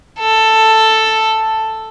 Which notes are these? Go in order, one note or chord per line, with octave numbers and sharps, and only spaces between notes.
A4